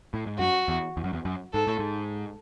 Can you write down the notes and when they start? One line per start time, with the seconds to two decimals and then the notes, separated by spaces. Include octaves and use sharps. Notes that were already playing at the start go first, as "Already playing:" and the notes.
0.14 A2
0.26 G#2
0.39 F#2 F#4
0.68 E2
0.97 E2
1.04 F#2
1.13 E2
1.25 F#2
1.54 G#2 A4
1.67 A2
1.79 G#2